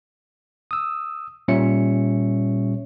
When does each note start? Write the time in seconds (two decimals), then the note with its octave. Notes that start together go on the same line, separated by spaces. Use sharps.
0.71 D#6 E6
1.48 A#2 G3 C#4 C#5 E5 C#7